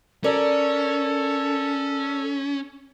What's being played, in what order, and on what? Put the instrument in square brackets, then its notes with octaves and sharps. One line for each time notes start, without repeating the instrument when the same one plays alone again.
[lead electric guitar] C#4 [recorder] A4 [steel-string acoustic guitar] A#4 D5